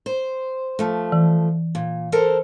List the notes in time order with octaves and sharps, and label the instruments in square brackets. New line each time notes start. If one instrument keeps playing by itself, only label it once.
[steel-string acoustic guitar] C5
F3 A3
[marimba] E3
[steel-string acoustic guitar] A#2
A4 A#4 C5